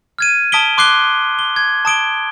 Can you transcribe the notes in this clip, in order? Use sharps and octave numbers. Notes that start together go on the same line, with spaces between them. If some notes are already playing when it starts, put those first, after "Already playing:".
F6 G#6 D#7
A5 D#6 B6 D7 G7
C6 D6 F#6 C7 G7
G7
G#6
A5 D#6 D7 G7